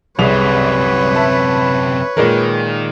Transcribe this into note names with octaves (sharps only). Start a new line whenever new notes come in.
C2 F#2 C3 G#4 B4 C#5 F7
E5 A5 B5
A#2 D#3 G#3 A#4